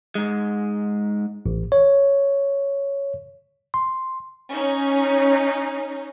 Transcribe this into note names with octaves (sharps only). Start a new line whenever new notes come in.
G#2 G#3
A1
C#5
C6
C#4 D#4